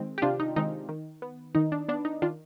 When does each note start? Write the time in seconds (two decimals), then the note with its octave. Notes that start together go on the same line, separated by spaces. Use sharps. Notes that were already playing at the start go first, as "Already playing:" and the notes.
Already playing: D#3 G#3 C4
0.18 G4
0.22 C3 D4 F4
0.40 D#4
0.56 D#3 G#3 C4 D#4
0.89 D#3
1.22 B3
1.55 D#3 D#4
1.72 D4
1.88 B3 D4
2.05 D#4
2.22 D#3 D4 F4